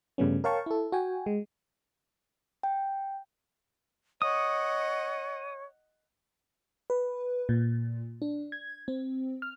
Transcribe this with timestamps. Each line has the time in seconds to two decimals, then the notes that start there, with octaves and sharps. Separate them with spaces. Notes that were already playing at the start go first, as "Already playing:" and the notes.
0.18 G2 C#3 G3 A3 B3 C#4
0.44 A#4 C#5 F5 G5 A5 C#6
0.66 E4 A4
0.92 F#4 G5 G#5
1.26 G#3
2.63 G5
4.22 C#5 D#5 F#5 D#6
6.90 B4
7.49 A#2
8.22 D4
8.52 G#6
8.88 C4
9.42 F6